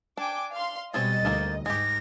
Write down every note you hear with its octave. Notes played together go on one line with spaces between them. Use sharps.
D4 G5 G#5 D6
F5 C6
B2 G3 G#3 C4 C#5 D#5 A6
D2 D#3 A#3 C4
G#2 G#3 G4 A#6